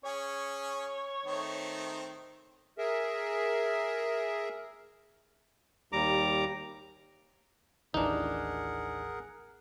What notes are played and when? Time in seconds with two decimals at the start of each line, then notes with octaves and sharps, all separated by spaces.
0.04 C#4 G#4 C#5
1.26 D#3 A3 C4
2.78 G#4 A#4 E5
5.92 D#2 G3 A#5 D6
7.94 A1 D#2 E3 D4 D#4 G#4 A#4 F#5